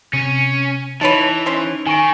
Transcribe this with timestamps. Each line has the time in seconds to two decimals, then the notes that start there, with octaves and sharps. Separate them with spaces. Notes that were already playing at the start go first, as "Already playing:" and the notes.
0.13 C3 C#4 D#7
1.01 E3 D#4 B4 C#5 A5 A6 D7 F7
1.46 C#4 C5
1.87 D#3 G#5 C#6 D7